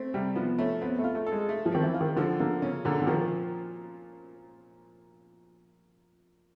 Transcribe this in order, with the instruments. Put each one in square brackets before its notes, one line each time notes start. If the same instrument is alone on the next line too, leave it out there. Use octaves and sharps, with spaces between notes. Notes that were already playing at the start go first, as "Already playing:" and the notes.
Already playing: [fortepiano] A3 C4
[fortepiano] C3 [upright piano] G3
[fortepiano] F3 [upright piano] B3
[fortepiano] A3 [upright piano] C#4
[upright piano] B3 [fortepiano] C4
[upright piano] A3
[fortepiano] F4
[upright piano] A3
[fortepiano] A4
[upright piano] G#3
[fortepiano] A3
[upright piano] F3
[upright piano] D#3 [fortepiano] C4
[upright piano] E3
[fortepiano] F4
[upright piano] D#3
[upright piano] D3 [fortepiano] F3
[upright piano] D3 [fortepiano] A#3
[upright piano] C#3 [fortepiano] C#4
[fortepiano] A#2 [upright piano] D3
[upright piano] D3
[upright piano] D#3 [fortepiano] F3